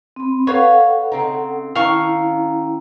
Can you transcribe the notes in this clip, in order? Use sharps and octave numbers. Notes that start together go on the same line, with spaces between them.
C4 B5
A4 B4 C#5 F5 F#5
C#3 C4 D#4
D#3 C#4 D4 E4 F5 C#6